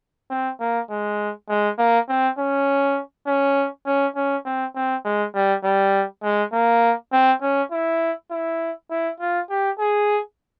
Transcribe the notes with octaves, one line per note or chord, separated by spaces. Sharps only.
C4
A#3
G#3
G#3
A#3
C4
C#4
C#4
C#4
C#4
C4
C4
G#3
G3
G3
G#3
A#3
C4
C#4
E4
E4
E4
F4
G4
G#4